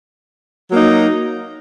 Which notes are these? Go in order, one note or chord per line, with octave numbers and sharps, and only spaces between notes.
F#3 A#3 D#4